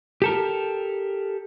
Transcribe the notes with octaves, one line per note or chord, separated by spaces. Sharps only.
G4 A4 A#4